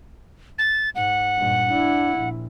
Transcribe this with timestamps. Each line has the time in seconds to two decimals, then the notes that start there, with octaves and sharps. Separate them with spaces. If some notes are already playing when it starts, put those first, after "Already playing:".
0.58 A6
0.95 G#2 F#5
1.38 G2 A#2
1.71 D4 E4
2.18 A#1